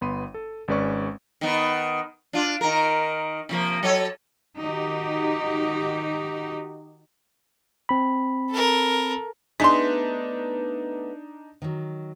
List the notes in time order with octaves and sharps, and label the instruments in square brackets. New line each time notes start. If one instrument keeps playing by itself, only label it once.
[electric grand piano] G1 B3 B5 C6 D#7
A4
G#1 G#3 C#4 B4 D5 C#6
[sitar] D#3 B3
D4 F4
D#3 A#4
C3 F3 A#3
F#3 A4 C#5
[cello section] D#3 D#4 F#4 G4
[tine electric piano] C4 B5
[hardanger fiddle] A4 A#4
[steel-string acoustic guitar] A3 B3 B4 [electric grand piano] D4 D#4 B6 [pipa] G#4 C6
[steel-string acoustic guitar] D#3 F#3